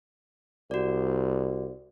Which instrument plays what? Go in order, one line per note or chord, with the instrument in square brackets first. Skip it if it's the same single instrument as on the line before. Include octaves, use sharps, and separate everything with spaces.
[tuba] C2 [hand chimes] F#4 D5